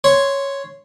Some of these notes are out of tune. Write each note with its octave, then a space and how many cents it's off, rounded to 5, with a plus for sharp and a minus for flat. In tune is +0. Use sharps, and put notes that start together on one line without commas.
C#5 +0 C6 -5